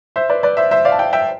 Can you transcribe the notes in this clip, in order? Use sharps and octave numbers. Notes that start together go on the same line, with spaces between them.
C5 E5
B4 D5
B4 D5
C5 E5
C5 E5
D5 F5
A5
E5 G5
E5 G5